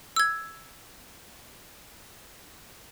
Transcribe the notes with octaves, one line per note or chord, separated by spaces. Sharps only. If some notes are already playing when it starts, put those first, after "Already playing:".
E6 G#6